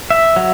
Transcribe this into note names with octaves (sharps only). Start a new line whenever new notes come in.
E5
F#3